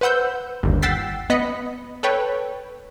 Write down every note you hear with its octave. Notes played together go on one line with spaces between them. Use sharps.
B4 C5 F#5 E6 G6
G1 D#2
F#5 G5 E6 A6 B6 C7
B3 D#5 B5 B6 C#7
A4 B4 C#5 G5